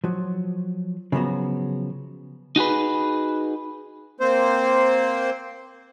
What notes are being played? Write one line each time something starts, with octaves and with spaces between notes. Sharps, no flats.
F3 F#3
C#3 F3 F#3 B3 F#4
D#4 F#4 G#4 B4
A#3 C4 C5